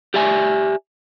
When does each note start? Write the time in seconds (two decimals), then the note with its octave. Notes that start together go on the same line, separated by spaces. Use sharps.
0.14 G4 D5 E5 G#5